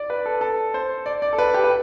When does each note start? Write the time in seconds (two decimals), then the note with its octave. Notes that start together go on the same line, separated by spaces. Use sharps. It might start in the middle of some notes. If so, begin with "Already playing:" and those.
Already playing: D5
0.10 B4
0.26 A4
0.41 A4
0.74 C5
1.06 D5
1.22 D5
1.33 A4
1.38 B4
1.54 G4
1.64 B4